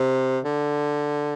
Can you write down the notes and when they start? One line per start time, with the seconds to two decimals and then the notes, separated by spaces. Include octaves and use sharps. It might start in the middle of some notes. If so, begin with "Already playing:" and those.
Already playing: C3
0.45 D3